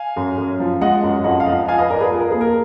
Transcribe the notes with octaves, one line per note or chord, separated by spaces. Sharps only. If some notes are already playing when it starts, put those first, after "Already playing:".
Already playing: F5 G#5
F#2
F#2
F3
G#3 D#5 F#5
F#2
F2 D#5 F#5
F5
F3 D#5 F#5
F3 F5 G#5
B4 D#5
F2 A#4 D5
G#4 B4
F3 G#4
A#4
A#3 G#4
A#4